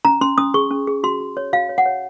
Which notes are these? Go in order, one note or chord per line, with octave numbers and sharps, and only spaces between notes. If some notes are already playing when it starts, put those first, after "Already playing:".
C#4 A#5
C#4 C6
C#4 D#6
G#4 C#6
C#4
G#4
F#4 C6
F#4
C#5
F#4 F5
C#5
F#5
C#5